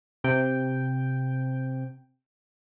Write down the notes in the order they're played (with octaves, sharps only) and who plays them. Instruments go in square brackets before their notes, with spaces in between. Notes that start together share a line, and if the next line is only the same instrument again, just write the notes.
[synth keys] C3 G5